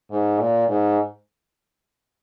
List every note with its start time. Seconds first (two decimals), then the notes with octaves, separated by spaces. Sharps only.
0.11 G#2
0.40 A#2
0.68 G#2